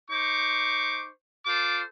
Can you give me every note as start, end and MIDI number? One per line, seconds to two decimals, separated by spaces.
0.10 1.10 63
0.10 1.10 72
0.10 1.10 85
0.10 1.10 86
1.46 1.82 65
1.46 1.82 69
1.46 1.82 72
1.46 1.82 86